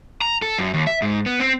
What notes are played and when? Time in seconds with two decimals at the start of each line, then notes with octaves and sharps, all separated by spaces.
0.21 A#5
0.42 A4
0.59 F#2
0.74 D#2
0.87 E5
1.02 G#2
1.26 B3
1.40 C4